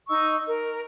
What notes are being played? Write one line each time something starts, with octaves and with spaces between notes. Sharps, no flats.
D#4 D#5 C#6 E6
A#4